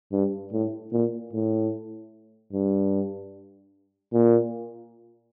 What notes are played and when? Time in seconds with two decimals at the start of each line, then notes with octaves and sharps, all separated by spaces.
0.12 G2
0.52 A2
0.92 A#2
1.33 A2
2.53 G2
4.13 A#2